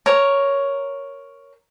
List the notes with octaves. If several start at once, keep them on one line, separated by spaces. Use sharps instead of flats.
A#4 C#5